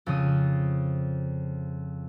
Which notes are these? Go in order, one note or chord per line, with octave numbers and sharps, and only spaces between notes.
F2 C#3 D#6